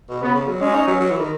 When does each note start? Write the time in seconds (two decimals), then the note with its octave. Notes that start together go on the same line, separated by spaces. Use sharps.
0.10 B2
0.22 C#3 B3
0.36 C#3
0.48 F#3
0.61 G#3 C#4
0.74 D#4
0.87 F#3
1.00 F#3
1.11 E3
1.20 D#3